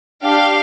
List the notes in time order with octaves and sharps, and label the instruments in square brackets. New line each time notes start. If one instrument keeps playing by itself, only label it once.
[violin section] D4 G4 F5